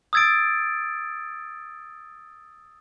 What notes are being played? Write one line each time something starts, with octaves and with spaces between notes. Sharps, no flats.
D#6 E6 G#6 A6 D7